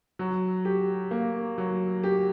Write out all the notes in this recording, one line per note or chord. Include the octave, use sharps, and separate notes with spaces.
F#3
G4
A#3
F#3
G4